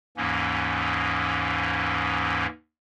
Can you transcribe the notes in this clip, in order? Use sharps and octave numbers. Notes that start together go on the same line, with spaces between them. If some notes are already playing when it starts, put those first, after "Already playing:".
D#2 G#2 E3 A#3 C#4